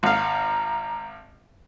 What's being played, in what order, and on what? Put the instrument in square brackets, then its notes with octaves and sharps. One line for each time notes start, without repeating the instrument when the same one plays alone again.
[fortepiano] G#1 F5 [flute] A#5